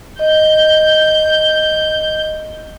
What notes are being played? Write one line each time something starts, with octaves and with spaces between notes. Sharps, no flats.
D#5 G6